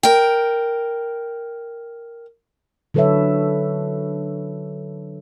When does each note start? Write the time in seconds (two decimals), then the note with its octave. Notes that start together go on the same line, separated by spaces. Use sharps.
0.03 A#4 G5
2.94 D3 F#3 A4 B4 C#5 E5